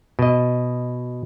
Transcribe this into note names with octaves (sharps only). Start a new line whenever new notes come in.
B2 D#5